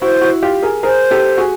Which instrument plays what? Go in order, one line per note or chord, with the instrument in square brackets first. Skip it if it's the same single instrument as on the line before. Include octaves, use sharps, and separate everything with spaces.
[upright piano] E4 F#4 [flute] C5
[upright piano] E4 F#4
F4 G4
G#4 A#4
[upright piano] G#4 A#4 [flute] C5
[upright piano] G4 A4
F#4 G#4